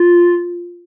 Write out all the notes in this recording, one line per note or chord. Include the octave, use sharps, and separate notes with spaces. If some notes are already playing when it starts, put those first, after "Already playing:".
Already playing: F4